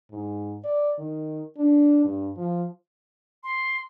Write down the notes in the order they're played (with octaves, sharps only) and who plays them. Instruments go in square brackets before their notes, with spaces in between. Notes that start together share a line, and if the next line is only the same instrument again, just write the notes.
[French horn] G#2
D5
D#3
D4
G2
F3
[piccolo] C6